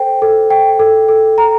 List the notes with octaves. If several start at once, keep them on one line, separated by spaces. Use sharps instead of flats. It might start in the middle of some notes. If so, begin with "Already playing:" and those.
Already playing: A4 C5 G5
A4
G5
A4
A4
A#5